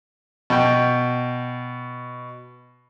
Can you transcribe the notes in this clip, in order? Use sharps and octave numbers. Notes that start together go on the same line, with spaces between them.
B2 G5